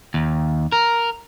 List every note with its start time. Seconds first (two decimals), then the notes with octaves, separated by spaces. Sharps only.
0.14 D#2
0.72 A#4